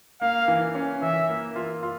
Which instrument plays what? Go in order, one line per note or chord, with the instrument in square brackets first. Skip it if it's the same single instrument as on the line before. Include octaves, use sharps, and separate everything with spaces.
[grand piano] A#3 [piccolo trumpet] F5
[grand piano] E3
C#4
[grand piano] E3 [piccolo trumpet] E5
[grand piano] A#3
F4
F4